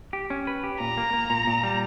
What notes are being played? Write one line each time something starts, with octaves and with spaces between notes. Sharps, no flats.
G4
C#4
B4
G4
A#2 A#5
A#3
A#3
A#2
A#2
G3